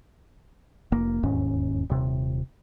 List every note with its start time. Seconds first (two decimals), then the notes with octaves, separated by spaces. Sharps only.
0.92 F1 A#3
1.23 E1 D#2 G#2 C#4
1.90 D#1 C3